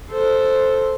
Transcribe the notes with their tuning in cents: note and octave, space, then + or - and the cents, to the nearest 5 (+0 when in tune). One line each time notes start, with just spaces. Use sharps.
A4 +0 C5 +0